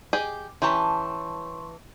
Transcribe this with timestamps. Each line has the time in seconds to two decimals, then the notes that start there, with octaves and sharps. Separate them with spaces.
0.13 G4 G#4 D#5
0.62 E3 C#4 G4 A5 A#5 C6 C#6